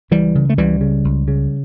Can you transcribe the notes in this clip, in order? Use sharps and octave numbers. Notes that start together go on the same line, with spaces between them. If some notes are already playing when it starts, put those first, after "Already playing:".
C#2 E3 G3
C#3
A3
C#2 E3 G3
C#3
C#2
C#3